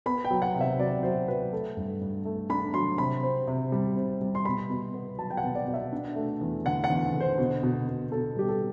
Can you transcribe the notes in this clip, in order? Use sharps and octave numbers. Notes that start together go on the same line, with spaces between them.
B3 B5
G5
F#3
F#5
C3
E5
F#3 D5
F#3 C5
F#3 B4
A3 A4
G2
G2
A3
D4 B5
F#3 C6
C3 B5
C4
C3
G3
C4
G3
C6
B2 B5
B2
B3
F#3 A5
G5
F#5
B2
D5
B2
E5
D4
A3
E2
D3 F#5
F#5
E2
D3
C5
B2
B2
B2
B2 A4
G3 G4
A4